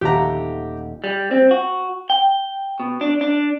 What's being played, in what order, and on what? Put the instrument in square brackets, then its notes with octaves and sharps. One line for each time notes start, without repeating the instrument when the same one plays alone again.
[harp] D#1 A3 F#5 [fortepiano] G4 A#5
[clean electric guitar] G3
C4
F#4
G5
B2
D4
D4